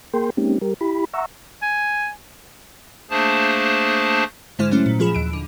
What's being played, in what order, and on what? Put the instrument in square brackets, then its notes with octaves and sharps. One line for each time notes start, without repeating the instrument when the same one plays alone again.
[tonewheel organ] A#3 G#4 A#4 G5 C6
G#3 A#3 C4 C#4 D#4 G4
G3 G4 A#4
E4 G4 B5
E5 F#5 A#5 C#6 E6
[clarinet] G#5
[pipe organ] A3 A#3 D4 G#4 C5 A5
[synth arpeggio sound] G#2 D3 G#3 E4 C5 F6
F#3 A3 C#4 E4
A#2
A#2 F3 F4 G#4 B5 E7
D#2 D7
D3